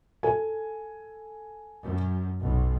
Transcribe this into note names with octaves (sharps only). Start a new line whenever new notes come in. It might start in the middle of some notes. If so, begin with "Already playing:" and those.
A4 G#5
F#2
B1